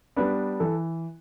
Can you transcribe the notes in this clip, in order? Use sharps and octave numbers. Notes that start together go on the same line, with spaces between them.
G3 B3 D4 B4
E3 A4